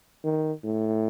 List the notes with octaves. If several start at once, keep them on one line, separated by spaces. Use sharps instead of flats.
D#3
A2